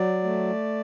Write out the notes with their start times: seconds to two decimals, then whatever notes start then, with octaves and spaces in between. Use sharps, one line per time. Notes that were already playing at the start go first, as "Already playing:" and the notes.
Already playing: F#3 D5
0.24 A3